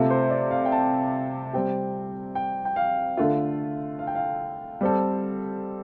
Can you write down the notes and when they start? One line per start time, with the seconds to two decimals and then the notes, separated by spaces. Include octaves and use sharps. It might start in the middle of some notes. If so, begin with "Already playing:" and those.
Already playing: C3 A3 F4 A4
0.10 C5
0.30 D5
0.51 F5
0.65 G5
0.72 A5
1.53 G3 C4 G4 G5
2.35 G5
2.65 G5
2.76 F5
3.17 D3 A3 F4
3.99 F5
4.07 G5
4.15 F5
4.81 G3 C4 A4